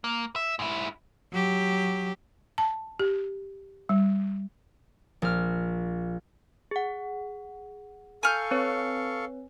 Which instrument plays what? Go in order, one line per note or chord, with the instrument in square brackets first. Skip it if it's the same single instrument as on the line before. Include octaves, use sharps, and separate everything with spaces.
[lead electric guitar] A#3
E5
G#2 E4
[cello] F#3 G4
[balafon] A5
G4
G3
[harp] A#1 F6
[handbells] G#4 F#5
[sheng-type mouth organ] A4 F5 C#6 [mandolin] G#5 F6 G6
[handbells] C4 B4 C#5